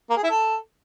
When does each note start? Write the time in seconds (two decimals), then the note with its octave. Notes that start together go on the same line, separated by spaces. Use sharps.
0.10 A#3
0.17 G#4
0.23 E4
0.30 A4